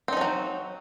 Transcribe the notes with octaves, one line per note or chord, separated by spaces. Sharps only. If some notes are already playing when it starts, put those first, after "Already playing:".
F3 F#3 C4 D#4